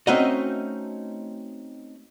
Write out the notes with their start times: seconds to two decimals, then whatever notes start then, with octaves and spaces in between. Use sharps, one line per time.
0.07 A3 C4 C#4 D#4 F#4 D#5